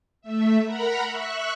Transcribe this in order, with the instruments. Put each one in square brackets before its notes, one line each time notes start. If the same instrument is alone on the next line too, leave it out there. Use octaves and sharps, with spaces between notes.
[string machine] A3 E5
A#4 F#5 A#5 B5
E5 C#6 F#6